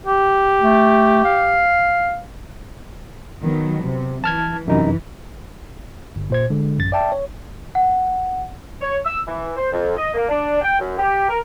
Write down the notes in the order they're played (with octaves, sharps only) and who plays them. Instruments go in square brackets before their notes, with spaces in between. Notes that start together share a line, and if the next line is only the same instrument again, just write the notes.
[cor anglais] G4
[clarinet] A3
F5
[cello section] D#3 F#3 B3
C3
[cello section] E3 [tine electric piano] A5 F6 G#6
[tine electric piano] F#2 C3 D#4 [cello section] E3
[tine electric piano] G1
A#2 C5 G#6
D3 G#3
A1 F#2 A6
D5 E5 G5 A5
C#5
[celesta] F#5
[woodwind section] C#5
E6
E3
C5
F2
D#5
A#3
D4
G5
F#2
G4
A#4